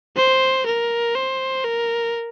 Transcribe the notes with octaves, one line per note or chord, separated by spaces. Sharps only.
C5
A#4
C5
A#4